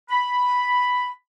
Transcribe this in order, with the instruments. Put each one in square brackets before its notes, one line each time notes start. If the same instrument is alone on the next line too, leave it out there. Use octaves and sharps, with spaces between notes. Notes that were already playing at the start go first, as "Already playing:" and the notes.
[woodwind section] B5